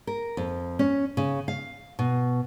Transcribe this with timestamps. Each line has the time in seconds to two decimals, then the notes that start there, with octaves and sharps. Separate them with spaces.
0.07 A#4
0.37 F2
0.79 C#4
1.17 C#3
1.48 F5
1.99 B2